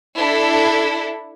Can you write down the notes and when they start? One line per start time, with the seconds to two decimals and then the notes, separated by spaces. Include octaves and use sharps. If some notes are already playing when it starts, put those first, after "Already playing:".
0.19 D4 E4 A4